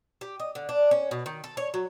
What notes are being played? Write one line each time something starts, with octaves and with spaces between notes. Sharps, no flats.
G4
D#5
D3
D4
C#4
B2
D#3
A4
C#5
F#3